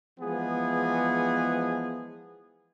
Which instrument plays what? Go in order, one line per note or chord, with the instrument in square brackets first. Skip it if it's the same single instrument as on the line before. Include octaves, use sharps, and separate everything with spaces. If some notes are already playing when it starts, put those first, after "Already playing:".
[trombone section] E3 F3 G#3 B3 G#4